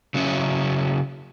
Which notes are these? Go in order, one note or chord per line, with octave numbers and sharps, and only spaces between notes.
C#3 F#3 C#4 E4